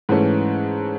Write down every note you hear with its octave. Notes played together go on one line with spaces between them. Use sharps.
G#2 E3 A3 C#4